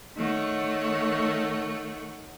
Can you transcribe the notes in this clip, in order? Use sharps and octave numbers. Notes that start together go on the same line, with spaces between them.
D#3 A3 C#5 F#5